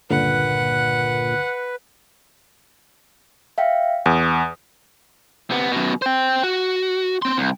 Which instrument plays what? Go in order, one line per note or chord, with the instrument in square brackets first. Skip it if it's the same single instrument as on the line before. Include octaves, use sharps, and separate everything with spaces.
[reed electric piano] C#2 G2 D3 [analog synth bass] A#2 [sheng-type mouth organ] B4 [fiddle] F#5
[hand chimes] E5 F5 G5
[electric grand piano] E2 [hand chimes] D#6
[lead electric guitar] C3 B3
F#2 B2
C5 G5
F#4
C4 C6
C2